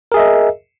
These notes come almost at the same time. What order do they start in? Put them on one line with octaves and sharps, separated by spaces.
A#4 G#4 E5 D#5